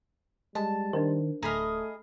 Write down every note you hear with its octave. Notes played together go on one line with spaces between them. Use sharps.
G3 G#3 A5
D#3 D4 A#4 C5
D1 A3 G#4 D#5 A#5 B5 F6